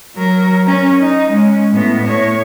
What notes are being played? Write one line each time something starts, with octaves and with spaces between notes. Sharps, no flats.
F#3 A#4
C#4 A#4
D#4
G#3 C#4
A2 B3
A2 C#5